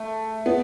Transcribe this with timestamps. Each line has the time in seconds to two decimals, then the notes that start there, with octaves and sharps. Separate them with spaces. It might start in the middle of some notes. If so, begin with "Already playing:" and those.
Already playing: A3
0.46 B3